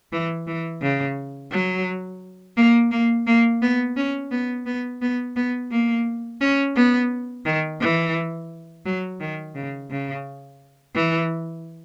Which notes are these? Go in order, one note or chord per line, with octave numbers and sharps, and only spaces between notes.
E3
E3
C#3
F#3
A#3
A#3
A#3
B3
C#4
B3
B3
B3
B3
A#3
C#4
B3
D#3
E3
F#3
D#3
C#3
C#3
E3